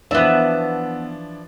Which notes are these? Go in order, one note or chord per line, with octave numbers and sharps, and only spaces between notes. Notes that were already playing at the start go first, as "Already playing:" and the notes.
E3 F3 B3 D4 E5